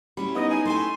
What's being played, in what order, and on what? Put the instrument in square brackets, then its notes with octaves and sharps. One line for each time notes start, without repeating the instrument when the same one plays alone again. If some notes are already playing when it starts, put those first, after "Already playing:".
[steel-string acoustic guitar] G3 C#4 E4 [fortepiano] B5
[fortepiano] B3 D#6 [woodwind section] D#4 [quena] D#5
[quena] G#5
[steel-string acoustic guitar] A3 E4 G#5 [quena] C6